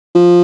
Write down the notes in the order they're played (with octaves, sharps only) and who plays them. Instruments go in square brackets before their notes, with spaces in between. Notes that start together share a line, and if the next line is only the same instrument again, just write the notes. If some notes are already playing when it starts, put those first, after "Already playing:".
[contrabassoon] F3